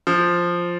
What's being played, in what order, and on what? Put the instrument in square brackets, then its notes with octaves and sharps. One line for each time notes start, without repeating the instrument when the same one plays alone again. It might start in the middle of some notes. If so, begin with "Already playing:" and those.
[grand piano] F3